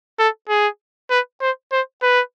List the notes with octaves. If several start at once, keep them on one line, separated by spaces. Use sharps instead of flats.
A4
G#4
B4
C5
C5
B4